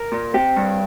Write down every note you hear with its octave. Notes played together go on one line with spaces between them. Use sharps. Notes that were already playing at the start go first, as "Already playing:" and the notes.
Already playing: A#4
A#2
C4 G4
G2